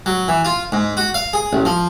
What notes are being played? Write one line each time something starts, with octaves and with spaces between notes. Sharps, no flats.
F#3
E3
F4
G#2
F#4
F5
G#4
A1
F3